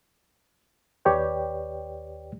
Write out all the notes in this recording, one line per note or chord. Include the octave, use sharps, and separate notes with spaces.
D#2 G4 B4 C#5 D5 G5